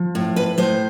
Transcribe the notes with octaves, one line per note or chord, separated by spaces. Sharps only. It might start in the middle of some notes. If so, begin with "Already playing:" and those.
Already playing: F3
A2
B4
A2 C5